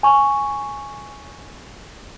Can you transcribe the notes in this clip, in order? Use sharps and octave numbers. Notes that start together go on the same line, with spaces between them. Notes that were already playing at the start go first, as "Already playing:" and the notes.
G#5 C#6